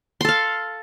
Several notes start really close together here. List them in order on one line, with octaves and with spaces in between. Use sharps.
C6 A4 F5